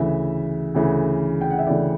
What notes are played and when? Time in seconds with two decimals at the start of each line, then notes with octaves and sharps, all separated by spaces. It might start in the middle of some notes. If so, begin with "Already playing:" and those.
Already playing: D2 C#3 E3 E5
0.75 D2 C#3 E3
1.41 G5
1.50 F#5
1.58 E5
1.67 D2 C#3 E3 D5